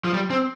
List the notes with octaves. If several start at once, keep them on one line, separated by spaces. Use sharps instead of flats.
F3
G3
C4